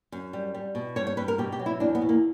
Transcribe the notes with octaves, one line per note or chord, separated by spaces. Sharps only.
F#2
G3
G3
B2
G2 C#5
C#5
G2 B4
A#4
B2 G4
G4
F#3
E4
E2 D4
B3
B2
A#3